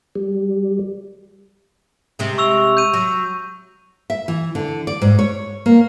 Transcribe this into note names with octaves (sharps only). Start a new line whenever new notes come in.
G3
C3 G#3
C#6 E6 F7
G6 D#7
F#3
E5
E3
D3
D5
G#2
C#5
A#3